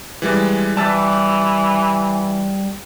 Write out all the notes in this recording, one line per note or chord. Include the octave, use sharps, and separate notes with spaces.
E3 G3 G#3
E3 G3 B4 A5 E6 A6